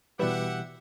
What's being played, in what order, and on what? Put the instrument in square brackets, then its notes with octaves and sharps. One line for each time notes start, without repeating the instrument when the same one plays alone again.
[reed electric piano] B2 E3 G3 [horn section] G4 E5 F#5 [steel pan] B4 D5